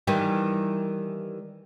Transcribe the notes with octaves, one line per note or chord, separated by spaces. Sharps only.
D#3 E3 G3